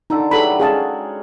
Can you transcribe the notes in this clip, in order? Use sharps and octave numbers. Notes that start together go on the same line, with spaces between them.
D3 D#4 A4 A#5
E3 F#3 G3 G#4 A4 B5
G#3 C#4 F#4 G#4 F5 A5